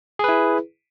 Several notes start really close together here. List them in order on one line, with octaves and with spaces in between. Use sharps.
G#4 B4 E4